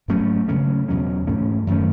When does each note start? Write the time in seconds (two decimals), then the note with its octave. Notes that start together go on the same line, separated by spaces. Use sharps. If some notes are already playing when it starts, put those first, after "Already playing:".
0.08 G#2 F#3 A3 C#4
0.48 C#3 F#3 A3 C#4
0.88 E2 B2 F#3 C#4
1.27 G#2 E3 A3 C#4
1.67 F#2 D#3 A3 C#4